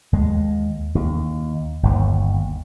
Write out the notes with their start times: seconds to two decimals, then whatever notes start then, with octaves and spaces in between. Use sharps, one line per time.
0.13 D#2 G#3
0.95 D#2
1.83 G1 D#2